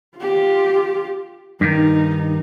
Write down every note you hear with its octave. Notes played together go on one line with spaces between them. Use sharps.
F4 G4
G2 D#3 D#4